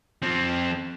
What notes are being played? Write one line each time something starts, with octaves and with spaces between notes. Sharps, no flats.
F3 C4